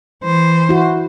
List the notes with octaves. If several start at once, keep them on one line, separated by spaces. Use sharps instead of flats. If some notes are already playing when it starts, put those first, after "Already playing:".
E3 C5
E4 F#4